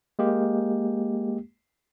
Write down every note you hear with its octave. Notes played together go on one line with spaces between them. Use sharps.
G#3 A#3 G4